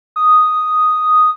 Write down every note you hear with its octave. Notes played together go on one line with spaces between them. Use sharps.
D#6